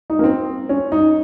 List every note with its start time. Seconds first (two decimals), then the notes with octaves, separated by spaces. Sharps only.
0.10 D#4
0.19 A#3
0.24 C4
0.69 C#4
0.92 D#4